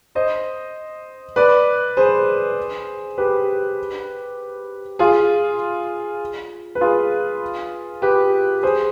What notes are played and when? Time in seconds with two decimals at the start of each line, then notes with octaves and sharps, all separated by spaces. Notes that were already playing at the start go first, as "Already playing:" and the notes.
0.15 C5 D#5
1.36 B4 D5
1.97 G#4 C5
3.18 G4 B4
4.99 F4 G#4
6.75 B4
6.81 F4 G#4
8.02 G4 B4
8.63 G#4 C5